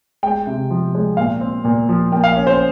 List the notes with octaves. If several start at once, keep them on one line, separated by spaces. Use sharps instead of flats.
G#3 G5
C3
F3
G#3
A#2 F5
C4
A#2
F3
A#3 G5
F5
C#4
C5